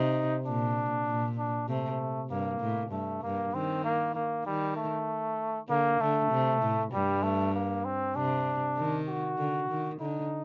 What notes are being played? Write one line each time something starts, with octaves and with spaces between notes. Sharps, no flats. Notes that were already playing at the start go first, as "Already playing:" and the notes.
Already playing: C3 D#4
A#2 D4
A#2
D4
C3 A3
G2 A#3
A2
G2 A3
G2 A#3
D#3 C4
A#3
A#3
D#3 G3
A3
D3 A#3
D3 A3
C3
A2
G2 G3
A3
A#3
C4
C3 D4
D#3
F#4
D3
D#3
D3 D#4